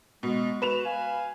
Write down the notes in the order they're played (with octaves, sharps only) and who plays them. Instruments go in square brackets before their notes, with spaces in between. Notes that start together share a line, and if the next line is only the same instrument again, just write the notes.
[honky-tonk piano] B2 [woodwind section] G#3
[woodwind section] F#4 [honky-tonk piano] B4 E7 F7
[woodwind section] F5 G#5